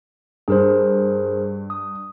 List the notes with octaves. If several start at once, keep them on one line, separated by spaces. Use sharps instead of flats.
G2 G#4 A#4 C5
D#6